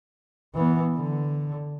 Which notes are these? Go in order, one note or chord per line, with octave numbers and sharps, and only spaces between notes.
E3 B3
D3